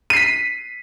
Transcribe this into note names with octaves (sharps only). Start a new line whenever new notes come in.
B6 C7 D#7